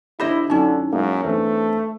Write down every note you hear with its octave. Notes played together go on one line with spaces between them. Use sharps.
D3 E4 G4 C5 D#5 B5
F#2 D3 C#4 D#4 E4
F#2 G#3 A#3
E2 A3 C4 D4